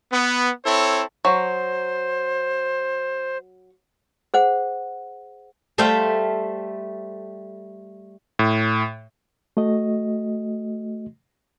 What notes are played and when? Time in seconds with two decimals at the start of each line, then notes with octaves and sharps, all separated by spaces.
0.12 B3
0.65 C4 E4 A4 C#5
1.25 F#3 C5
4.34 G#4 C5 F#5
5.78 G3 A3 C5 E5 F5 G5
8.39 A2
9.57 A3 F#4 D#5